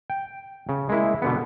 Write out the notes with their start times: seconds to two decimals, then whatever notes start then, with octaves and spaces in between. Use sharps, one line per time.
0.10 G5
0.69 C#3
0.89 G#3 A#3 E4
1.22 B2 D3 B3